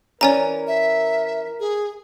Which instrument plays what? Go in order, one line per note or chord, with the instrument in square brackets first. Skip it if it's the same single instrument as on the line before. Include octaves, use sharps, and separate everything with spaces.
[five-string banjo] E3 C#4 [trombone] A#4 [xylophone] D5 G#5 A#5
[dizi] E5
G#4